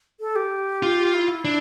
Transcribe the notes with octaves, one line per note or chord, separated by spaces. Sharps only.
A4
G4
F4
E4
D4